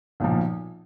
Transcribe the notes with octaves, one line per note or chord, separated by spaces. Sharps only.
B1 A#2 F3